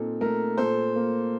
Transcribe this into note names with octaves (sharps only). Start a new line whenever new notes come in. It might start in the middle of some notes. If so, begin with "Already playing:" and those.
Already playing: A#2 C4 D#4 A4
A3 A#4
A#2 A4 C5
A#3